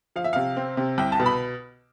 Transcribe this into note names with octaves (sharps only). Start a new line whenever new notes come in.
F3 F5
E5
C3 F5
C4
C3
C2 G5
A5
B2
B5